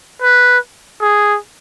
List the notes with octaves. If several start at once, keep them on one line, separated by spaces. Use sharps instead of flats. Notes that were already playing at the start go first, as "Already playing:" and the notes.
B4
G#4